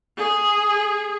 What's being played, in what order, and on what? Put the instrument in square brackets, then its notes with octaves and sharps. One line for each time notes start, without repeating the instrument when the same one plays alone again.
[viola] G#4